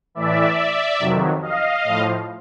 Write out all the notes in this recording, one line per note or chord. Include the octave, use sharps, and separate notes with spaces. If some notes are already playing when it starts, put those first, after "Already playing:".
A2 E3 D5 E5
F2 C3 D#3 F#3
D#5 F5
A2 F3